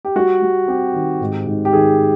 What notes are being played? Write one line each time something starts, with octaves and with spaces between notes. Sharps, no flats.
G4
G3 F#4
G3
C4 G4
D#3
G#2
G#2
G4
D#3 G#4